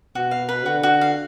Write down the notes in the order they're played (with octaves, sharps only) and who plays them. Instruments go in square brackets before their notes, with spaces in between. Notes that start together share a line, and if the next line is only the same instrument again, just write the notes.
[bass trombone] B2 [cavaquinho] F#4
[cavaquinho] F5
B4
[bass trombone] D3 [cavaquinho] F#4
[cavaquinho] F#4
F5